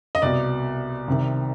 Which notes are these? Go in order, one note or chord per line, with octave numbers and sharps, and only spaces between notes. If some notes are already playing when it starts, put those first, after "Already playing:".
D#5
C2 B2 D5
C2 C3 D#3